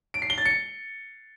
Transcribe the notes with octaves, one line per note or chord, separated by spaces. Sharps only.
D7
C7
G7
A6
C#7